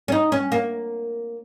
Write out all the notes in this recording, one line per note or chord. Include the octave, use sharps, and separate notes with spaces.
C#4
D#4
C#4
A#3